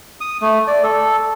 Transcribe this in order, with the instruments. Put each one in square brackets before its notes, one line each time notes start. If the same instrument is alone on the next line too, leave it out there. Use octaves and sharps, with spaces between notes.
[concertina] D#6
A3
D5
A4